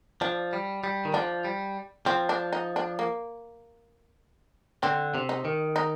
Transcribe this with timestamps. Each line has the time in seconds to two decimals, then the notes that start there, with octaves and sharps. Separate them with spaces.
0.21 F3 D4
0.53 G3
0.84 G3
1.05 D#3
1.14 F3 D4
1.45 G3
2.06 F3 C4
2.29 D4
2.53 D#4
2.76 D4
2.99 A#3
4.83 D3 C4
5.15 C3
5.29 D#4
5.45 D#3
5.76 D#4